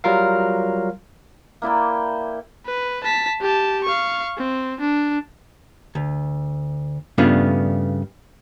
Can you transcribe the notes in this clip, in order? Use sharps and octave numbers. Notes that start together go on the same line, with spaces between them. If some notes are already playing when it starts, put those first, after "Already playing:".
F#3 G3 F4 A#4 F5
A#3 E4 D5 G5
B4
A5 B6
G4 A5
F5 C#6
C4
D4
D2
G2 C#3 A3 B3 D4 F4